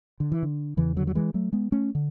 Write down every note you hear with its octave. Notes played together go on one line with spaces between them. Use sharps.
D3
E3
D3
E2 C#3 E3
D3 F#3
F#3
E3 G#3
F#3 A3
G#3 B3
A3 C#4
D3